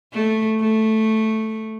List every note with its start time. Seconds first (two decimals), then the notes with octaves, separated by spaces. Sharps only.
0.13 A3
0.60 A3